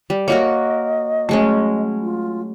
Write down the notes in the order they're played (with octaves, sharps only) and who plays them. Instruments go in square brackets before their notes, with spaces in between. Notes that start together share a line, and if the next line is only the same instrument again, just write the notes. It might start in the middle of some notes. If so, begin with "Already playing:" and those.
[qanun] G3
[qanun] A#3 F#4 A#4 [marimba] C#5 [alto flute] D#5
[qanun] F#3 G#3 C#4 [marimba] A3
[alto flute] F4